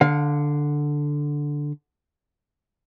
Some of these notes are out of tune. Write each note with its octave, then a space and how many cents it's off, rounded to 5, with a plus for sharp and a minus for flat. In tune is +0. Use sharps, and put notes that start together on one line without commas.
D3 +0 F5 +25